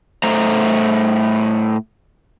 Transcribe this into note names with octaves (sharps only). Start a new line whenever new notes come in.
A2 A3 C5 A#5